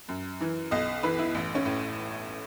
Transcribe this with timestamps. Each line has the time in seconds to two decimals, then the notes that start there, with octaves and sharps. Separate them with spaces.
0.08 F#2
0.41 E3
0.71 B1 D#5
1.03 E3 B4
1.19 E4
1.35 A1
1.55 C#4
1.65 A2